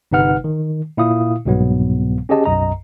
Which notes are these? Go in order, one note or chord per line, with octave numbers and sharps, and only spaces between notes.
G1 C3 D#4 B4 F#5 F6
D#3
A#2 E4 F5 D#6
C2 G#2 B2 F#3 B3
C#4 G4 G#4 D#5 A5
B1 F#2 D#5 A#5